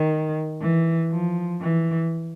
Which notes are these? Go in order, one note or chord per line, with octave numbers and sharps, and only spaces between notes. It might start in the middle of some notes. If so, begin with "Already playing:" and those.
Already playing: D#3
E3
F3
E3